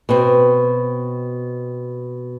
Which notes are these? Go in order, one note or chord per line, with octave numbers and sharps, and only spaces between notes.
B2 C4